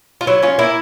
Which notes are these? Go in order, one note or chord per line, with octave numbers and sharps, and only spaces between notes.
F4
F#3 E4
C#4 F4
A#3 E4